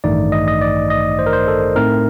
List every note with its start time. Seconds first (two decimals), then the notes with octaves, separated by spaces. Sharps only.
0.04 A1 G2 D#3 A3 D#4 D5
0.32 D#5
0.48 D#5
0.61 D5
0.90 D#5
1.19 C5
1.27 A#4
1.33 C5
1.48 A4
1.76 A2 A3 C4 D#4 A#4